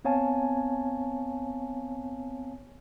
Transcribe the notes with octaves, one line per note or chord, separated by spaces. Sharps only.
B3 C4 C#5 F5 G#5 A5